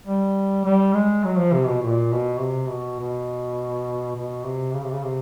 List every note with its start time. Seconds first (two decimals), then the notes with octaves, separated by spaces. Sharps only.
0.07 G3
0.65 G3
0.94 G#3
1.24 F#3
1.38 F3
1.53 C3
1.67 B2
1.83 A#2
2.12 B2
2.41 C3
2.70 B2
3.00 B2
4.16 B2
4.46 C3
4.74 C#3
4.83 C3
4.92 C#3
5.04 C3